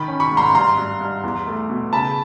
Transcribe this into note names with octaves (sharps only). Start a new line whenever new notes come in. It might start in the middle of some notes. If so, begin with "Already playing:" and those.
Already playing: D#3 B5
C#4
B5 C#6
G#2
A#5 C6
G2 A#5 C6
G2
G2
E2
A3
B2
C#3 A5 B5